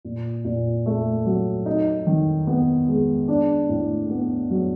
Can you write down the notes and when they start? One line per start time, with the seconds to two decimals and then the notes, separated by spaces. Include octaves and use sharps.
0.05 A#2
0.45 A#2
0.86 A3
1.26 F#3
1.66 D#4
2.07 D#3
2.47 B3
2.88 G#3
3.28 D4
3.69 A2
4.10 B3
4.50 F#3